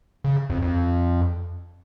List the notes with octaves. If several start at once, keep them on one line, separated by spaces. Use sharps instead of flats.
C#3
F2
F2